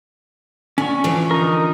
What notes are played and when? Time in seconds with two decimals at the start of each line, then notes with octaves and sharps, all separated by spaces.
0.78 D3 C#4 C#6
1.04 D3 E3 F3
1.31 D#4 A#4